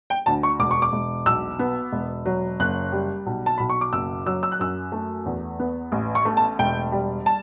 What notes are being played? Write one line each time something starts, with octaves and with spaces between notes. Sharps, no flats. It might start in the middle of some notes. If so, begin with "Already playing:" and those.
G5
D2 A5
C#6
E1 D6
C#6
D6
E1
B1 E6
B3
E1
F#3
F#1 F#6
G3
B1
A5
B1 B5
C#6
D6
F#1 E6
F#3 E6
E6
F#6
F#2 E6
A3
E2
B3
A1
C#6
A3
A5
E1 G5
G3
A5